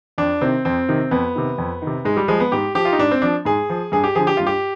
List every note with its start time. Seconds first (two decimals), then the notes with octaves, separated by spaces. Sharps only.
0.18 F2 D4
0.41 C3 D#3 C4
0.65 F2 C4
0.89 C3 D#3
1.11 F2 B3
1.36 C3 D#3
1.58 F2
1.82 D#3
1.87 C3
2.05 G#2 G#3
2.16 G3
2.28 F3 G#3
2.40 B3
2.52 G#2 G4
2.75 F3 G4
2.85 F4
2.92 D#4
2.99 G#2 D4
3.11 C4
3.22 F3 D4
3.45 G#2 G#4
3.70 F3
3.92 G2 G#4
4.04 G4
4.15 D3 F3 G#4
4.27 G4
4.37 G2 F4
4.47 G4